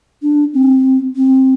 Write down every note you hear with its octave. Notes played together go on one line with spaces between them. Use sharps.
D4
C4
C4